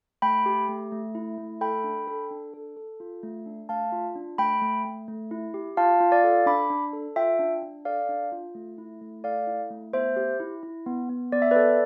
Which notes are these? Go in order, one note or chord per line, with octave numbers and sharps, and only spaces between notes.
A3 G5 B5
G4
A3
A3
E4
A3
A4 G5 B5
D4
A4
D4
A4
A4
F4
A3
D4
A3 F5 A5
F4
D4
A3 G5 B5
A3
A3
A3
E4
G4
F4 F5 A5
F4
D5 F5
A4
D4 B5 D6
D4
A4
F4 E5 G5
D4
D4
A4 D5 F5
D4
F4
A3
E4
A3
A4 D5 F5
E4
A3
B3 C5 E5
G4
E4
E4
B3
B3
B3 D5
E5
A4 B4 D5